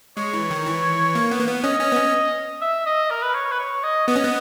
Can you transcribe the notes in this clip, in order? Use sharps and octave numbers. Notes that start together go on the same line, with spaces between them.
G#3 C#5
E3
D#3
E3
A#3
B3
A#3
B3
C#4 D#5
C#4
B3
C#4
E5
D#5
A#4
B4
C#5
B4
C#5
D#5
B3 D#5
C#4
B3